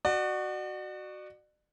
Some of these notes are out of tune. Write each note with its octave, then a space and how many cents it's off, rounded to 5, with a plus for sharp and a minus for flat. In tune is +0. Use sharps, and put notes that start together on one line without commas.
F#4 +5 D5 +40